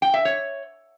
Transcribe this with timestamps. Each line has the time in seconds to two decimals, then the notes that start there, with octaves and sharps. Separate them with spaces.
0.02 G5
0.14 E5
0.25 C#5